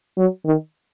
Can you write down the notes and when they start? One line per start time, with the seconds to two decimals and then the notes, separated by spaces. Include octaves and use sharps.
0.17 F#3
0.45 D#3